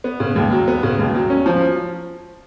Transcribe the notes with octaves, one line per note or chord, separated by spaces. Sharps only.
B3
C#3
D#2
F#3
B3
C#3
D#2
F#3
C#4
F3